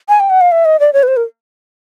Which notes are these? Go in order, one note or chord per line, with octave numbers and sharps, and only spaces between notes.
G#5
G5
F#5
F5
E5
D#5
D5
C#5
B4
C5
A#4